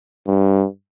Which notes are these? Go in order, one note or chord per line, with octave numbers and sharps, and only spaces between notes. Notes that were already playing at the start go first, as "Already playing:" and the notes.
G2